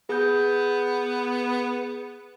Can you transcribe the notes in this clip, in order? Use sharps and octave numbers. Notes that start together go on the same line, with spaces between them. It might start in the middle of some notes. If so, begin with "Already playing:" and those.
B3 G#4 G6